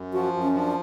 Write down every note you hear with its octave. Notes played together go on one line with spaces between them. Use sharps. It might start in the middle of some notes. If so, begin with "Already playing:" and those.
Already playing: F#2
F3 F#4
F#2
C#4
F3
D4